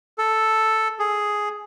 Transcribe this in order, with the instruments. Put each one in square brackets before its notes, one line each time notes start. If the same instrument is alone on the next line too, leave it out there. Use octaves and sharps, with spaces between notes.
[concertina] A4
G#4